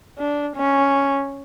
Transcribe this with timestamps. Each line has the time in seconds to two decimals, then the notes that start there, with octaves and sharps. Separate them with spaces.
0.18 D4
0.56 C#4